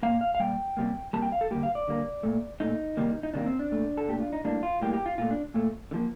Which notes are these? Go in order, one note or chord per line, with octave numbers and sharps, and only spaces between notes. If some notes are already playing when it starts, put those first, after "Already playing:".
A#2 G3 A#3 F5
F5
F5
A#2 G3 G5
C3 G3 A#3
C3 G3 A#3 A5
G5
F5
A4
D3 G3 A#3 G4
F5
D5
D3 G3 A#3
A#2 A3
A#2 A3 D#4
C3 D#3 G3 A#3
D#4
C3 D#3 G3 A#3 D4
C4
D4
A#2 A3
A4
A#2 A3 G4
F4
D#4
A2 G3 A#3 D4
F4
A2 G3 A#3 G4
G4
F4
A#2 A3 F4
D4
A#2 A3
D3
F3 A#3